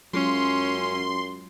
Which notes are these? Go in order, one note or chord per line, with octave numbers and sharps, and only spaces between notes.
F#2 F#3 G#3 C#4 F4 C6